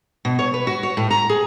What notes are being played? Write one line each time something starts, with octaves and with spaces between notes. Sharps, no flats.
B2
C#5
B4
F#4
C#5
A2
A#5
G#4